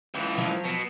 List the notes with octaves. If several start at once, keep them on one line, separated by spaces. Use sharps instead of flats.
C#2 E3
F3 F#3
B2